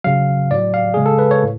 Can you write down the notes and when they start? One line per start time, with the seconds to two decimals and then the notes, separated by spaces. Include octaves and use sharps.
0.04 C#3 F#3 F5
0.51 A2 F#3 D5
0.74 F5
0.94 C#3 G#3 G#4
1.06 A4
1.19 B4
1.31 C#5
1.43 A2